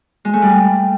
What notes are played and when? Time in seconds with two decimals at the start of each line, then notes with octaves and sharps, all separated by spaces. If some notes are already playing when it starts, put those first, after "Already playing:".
0.25 G#3
0.33 A3
0.42 G3